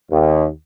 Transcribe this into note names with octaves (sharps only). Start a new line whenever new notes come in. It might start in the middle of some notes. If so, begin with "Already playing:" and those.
D#2